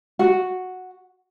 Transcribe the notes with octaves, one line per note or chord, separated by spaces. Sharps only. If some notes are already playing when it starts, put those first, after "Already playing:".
F#4